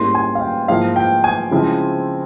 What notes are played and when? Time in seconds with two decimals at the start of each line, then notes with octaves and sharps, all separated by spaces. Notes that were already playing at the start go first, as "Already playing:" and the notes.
Already playing: G#2 G3 A#3 C#4 E4 C6
0.15 G#5
0.35 F5
0.41 G5
0.68 G#2 F3 A#3 E4 F5
0.96 G5
1.24 G#5
1.51 C#3 F3 G#3 C4 E4